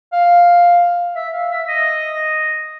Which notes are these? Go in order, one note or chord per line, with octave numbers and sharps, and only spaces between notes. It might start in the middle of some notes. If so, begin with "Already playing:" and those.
F5
E5
F5
E5
D#5